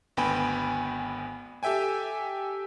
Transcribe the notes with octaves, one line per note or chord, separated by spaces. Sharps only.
G#1 D2 B3 G5 G#5 B5
G4 A4 E5 G5 G#5